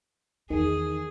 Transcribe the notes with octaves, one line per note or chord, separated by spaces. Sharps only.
E2 D#3 G#4